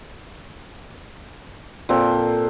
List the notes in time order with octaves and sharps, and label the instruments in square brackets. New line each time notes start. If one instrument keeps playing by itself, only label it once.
[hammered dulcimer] A#2 C4 A4